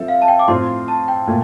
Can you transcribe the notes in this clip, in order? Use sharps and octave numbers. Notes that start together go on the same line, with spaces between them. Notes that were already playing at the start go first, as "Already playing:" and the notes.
Already playing: F3 C4 A4 E5
F5
A5
G5
D6
A2 F3 C4 F4 C6
A5
G5
A#2 A3